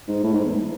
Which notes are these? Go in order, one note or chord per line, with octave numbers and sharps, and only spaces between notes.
G#2
A2
G#2
E2